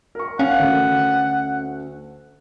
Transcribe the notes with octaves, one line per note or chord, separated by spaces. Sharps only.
A#4 C#6
C#4 F5 F#5
D2 A3